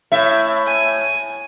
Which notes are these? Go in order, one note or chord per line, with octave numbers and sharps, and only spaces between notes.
A2 E5
G#5